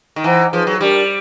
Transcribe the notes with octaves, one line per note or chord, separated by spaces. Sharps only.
D#3
E3 C5 D#5 F#5 A#5
F3 D#4 G#4 B4
F#3
G3 D4 G4 A#4 D5